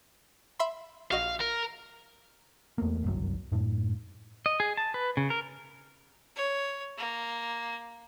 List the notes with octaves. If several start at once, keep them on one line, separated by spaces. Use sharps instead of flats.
E5 B5 C6
A#1 F#4 D#5 F5
A#4
E2 A3 A#3
G1 C2 F#2 F#3
F#2 A2
D#5
G#4
A5
B4
C#3
A#4
C#5
A#3